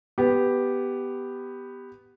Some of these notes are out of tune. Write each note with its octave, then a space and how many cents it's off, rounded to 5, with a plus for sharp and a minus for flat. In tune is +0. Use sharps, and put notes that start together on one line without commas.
B3 +5 G4 +0